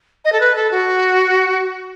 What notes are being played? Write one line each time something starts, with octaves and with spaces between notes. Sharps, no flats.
D#5
A4
B4
A4
F#4